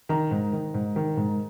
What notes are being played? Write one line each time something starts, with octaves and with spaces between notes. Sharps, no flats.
D#3 A#5
G#2
D#3
G#2
D#3
G#2